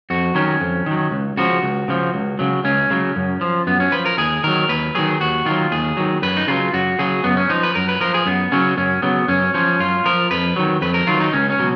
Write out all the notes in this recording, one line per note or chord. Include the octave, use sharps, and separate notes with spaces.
F2 F#4
D#3 F#3 C#4
F2
D#3 F#3
C#2
C#3 F3 F#4
C#2
C#3 F3
C#2
C#3 F#3
C#2 C#4
C#3 F#3
F#2
F3
F#2 B3
C#4
F3 B4
A#4
D#2 G#4
D#3 F#3 A#4
D#2 B4
D#3 F#3 G#4
D#2 F#4
D#3 F#3 F4
D#2 G#4
D#3 F#3
F#2 B4
D#4
C#3 F#3 F4
F#2 F#4
C#3 F#3 G#4
F#2 B3
C#4
F3 D#4
B4
F#2 A#4
B4
F3 A#4
G#4
F#2 B3
C#3 F#3 C#4
F#2 C#4
C#3 F#3 B3
F#2 C#4
F3 C#4
F#2 F4
F3 A#4
F2 B4
D#3 F#3
F2 B4
A#4
D#3 F#3 F4
D#4
C#2 C#4
C#4
B2 F#3